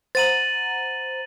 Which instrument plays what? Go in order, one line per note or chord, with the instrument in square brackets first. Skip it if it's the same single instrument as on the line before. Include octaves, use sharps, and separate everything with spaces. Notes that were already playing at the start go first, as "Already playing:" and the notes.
[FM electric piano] C5 F#5 A#5 [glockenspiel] A6 D#7 F#7